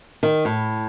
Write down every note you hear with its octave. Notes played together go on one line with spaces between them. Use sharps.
D#3
A2